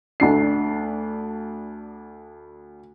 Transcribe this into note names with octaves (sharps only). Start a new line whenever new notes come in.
D2 D4 C7